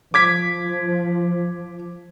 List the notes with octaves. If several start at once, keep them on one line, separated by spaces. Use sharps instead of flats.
F3 D6 G#6 B6